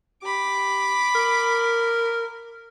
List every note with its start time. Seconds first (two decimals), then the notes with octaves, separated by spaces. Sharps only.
0.23 G4 B5 D6
1.15 A#4